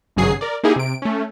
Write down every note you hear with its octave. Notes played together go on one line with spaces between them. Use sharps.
G#1 G2 C#3 F#3 G#4 C7
A#4 D5
A#3 D#4 E4 G4 G#4
C3 D7
A3 C#4